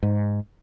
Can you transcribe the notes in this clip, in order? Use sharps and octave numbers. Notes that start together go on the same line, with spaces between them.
G#2